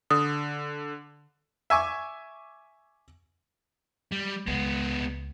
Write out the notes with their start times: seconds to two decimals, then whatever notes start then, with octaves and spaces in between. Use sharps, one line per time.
0.11 D3 D#6
1.70 E5 G#5 C#6 D6
4.11 G3
4.47 C#2 G#3 B3